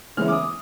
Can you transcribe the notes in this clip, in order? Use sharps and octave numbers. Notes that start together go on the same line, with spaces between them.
C#3 E3 G#3 B3 E4 F6
D6
D#6